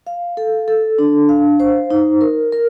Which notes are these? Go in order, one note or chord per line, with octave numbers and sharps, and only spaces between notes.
F5
A4
A4
D4
F5
C5
D#4
A#4
A#4